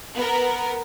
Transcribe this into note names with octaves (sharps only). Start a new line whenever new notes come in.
B3 A#4